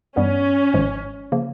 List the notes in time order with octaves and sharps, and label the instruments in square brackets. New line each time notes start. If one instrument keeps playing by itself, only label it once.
[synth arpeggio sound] G2 E3 G3 B3 [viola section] C#4
[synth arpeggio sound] G#1 G#2 F3 G#3
C#3 F3 A#3